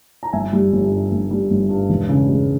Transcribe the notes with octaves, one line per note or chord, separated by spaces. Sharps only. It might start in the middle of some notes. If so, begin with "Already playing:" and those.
A#5
G1 E5 G#5
G3
G1
G2
G1
G3
G1
G2
E1
C#3
G#3